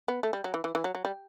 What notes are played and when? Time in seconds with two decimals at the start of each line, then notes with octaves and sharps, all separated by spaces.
0.08 B3
0.23 A3
0.33 G3
0.44 F#3
0.54 E3
0.64 E3
0.75 E3
0.84 F#3
0.95 F#3
1.05 G3